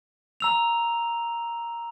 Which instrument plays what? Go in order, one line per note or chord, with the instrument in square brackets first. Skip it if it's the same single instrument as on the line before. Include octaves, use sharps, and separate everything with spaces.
[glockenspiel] A#5 E6 F7